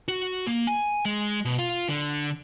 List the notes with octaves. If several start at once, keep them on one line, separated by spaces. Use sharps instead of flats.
F#4
A#3
G#5
G#3
B2
F4
D3